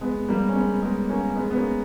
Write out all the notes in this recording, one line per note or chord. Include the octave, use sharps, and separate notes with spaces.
G#3 B3
G3 A#3
C#4
G#3 B3
G#3 B3
A#3 C#4
G#3 B3
B3
A#3 C#4